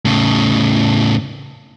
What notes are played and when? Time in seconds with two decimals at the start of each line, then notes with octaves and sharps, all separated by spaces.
0.05 A2 C#3